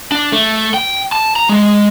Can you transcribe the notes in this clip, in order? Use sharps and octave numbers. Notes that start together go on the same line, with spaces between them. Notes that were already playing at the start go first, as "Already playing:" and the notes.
D4
A3
G5
A5
A#5
G#3